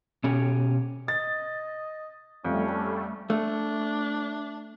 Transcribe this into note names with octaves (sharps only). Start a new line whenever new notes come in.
B2 C#4 G4
D#5 A6
F2 G3 A3 C#4
A3 D4